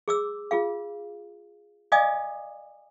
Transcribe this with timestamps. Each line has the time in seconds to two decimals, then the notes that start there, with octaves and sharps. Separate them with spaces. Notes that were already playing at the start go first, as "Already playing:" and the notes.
0.08 G#4 D6 E6
0.51 F4 G#4 F5
1.92 D5 D#5 F5 G#5 D6 D#6